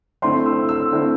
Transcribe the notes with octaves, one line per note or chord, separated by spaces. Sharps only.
D3 A3 C4 E4 C6
E6
E6
D3 A3 C4 E4